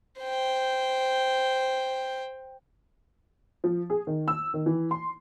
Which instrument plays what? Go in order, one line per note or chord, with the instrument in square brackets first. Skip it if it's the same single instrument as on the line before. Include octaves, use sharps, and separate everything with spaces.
[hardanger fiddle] C5 G5
[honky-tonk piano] F3
G#4
D#3
E6
D#3
E3
C6